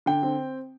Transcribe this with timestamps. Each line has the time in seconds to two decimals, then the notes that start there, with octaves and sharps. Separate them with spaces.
0.06 D3 G5
0.23 C4